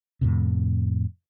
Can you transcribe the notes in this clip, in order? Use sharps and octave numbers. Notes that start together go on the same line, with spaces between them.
F2 A2 C3